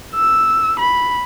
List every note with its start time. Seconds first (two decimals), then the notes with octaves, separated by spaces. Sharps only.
0.14 E6
0.79 B5